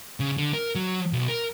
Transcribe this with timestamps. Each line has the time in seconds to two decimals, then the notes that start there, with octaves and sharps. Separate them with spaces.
0.20 C#3
0.37 D3
0.54 A#4
0.75 F#3
1.13 B1
1.28 A#4